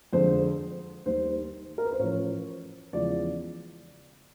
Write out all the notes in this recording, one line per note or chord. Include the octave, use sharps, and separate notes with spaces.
F2 D3 F3 G#3 C5
D#2 D#3 G3 C5
A#4
B4
C5
A1 A2 F3 C#5
E2 C#3 F3 G#3 D5